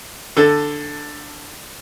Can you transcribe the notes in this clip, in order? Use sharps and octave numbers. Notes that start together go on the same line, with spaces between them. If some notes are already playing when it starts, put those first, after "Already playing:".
D3 A4